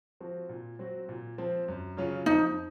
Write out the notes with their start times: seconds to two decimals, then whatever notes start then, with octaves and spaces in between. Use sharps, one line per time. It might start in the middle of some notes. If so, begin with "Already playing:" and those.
0.20 F3 C4 F#4
0.49 A#2
0.79 F#3 C4 F#4
1.09 A#2
1.38 F3 C4
1.68 F#2
1.97 C#3 F#3 C#4 F4
2.26 F2 D#4